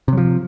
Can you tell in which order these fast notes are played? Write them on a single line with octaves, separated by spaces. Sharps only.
C3 F#3 F3